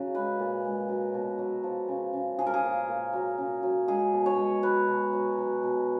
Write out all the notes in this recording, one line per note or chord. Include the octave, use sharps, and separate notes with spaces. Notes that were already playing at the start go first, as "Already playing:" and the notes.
Already playing: C#3 F#3
G#3 B4
A#2
G#3
F#3
B2
F#3
F3
C#3
C#3
F3 G#4
A#4
G#4
A#2
A#2
F#3
C#3
F#3
G#3 G#4
B2
C#5
G#3
F#3 B4
B2
F#3
F#3
B2